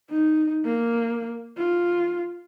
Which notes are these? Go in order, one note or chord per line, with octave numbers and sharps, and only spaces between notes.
D#4
A#3
F4